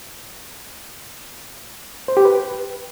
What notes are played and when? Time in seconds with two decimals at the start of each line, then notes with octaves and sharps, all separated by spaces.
2.08 C5
2.17 G4
2.25 B4